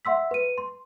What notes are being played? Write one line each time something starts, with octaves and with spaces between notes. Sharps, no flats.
E5 F#5 C6 E6 B6
B4 D#7
C6